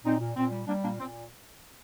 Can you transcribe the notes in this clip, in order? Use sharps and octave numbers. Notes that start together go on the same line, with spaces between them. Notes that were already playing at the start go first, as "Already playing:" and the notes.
A#2 C4 D#4
A#2
A#2 C4
G3
G3 A#3 D4
A#2 A#3 D4
A#2 C4